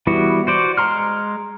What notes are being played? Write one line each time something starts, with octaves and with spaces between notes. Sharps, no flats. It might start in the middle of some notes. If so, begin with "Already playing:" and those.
E3 G3 B3 E4 F#4
F#4 C5 D5
G#3 A#5 C6 F6